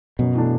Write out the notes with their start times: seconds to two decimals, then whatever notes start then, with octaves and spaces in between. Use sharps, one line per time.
0.19 F#2 B2
0.35 E3 A3 D4